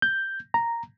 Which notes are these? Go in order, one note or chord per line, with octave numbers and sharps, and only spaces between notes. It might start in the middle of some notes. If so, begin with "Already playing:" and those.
G6
A#5